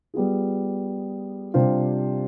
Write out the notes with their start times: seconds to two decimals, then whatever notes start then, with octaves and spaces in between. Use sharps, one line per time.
0.14 G3 B3 F4 G#4
1.54 C3 G3 D4 F4 C5